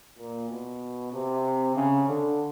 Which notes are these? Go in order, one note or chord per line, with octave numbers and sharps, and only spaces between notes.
A#2
B2
C3
C#3
D3